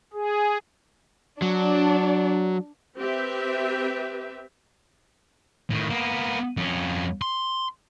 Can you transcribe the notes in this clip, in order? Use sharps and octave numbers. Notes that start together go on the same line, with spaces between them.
G#4
F#3 D4
C4 G4 B4 E5
A2 D#3
A#3 B3
F2 C#4
C6